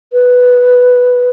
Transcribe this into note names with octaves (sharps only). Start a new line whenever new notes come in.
B4